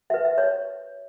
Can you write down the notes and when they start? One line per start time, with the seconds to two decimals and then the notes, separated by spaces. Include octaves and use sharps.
0.10 F#4 B4 E5
0.25 E5
0.38 C#5